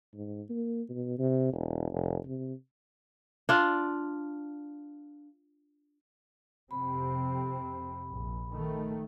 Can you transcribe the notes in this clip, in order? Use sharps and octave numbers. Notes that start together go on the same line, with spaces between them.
G#2
A#3
B2
C3
E1
F1
C3
D4 F4
F2 C3 C4 B5
A#1
D#3 A3